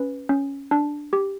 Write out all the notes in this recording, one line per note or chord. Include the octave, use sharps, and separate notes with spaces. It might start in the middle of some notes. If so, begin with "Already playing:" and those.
Already playing: C#4 B4
C#4
D4
G4